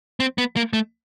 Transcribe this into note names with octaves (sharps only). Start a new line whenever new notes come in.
C4
B3
A#3
A3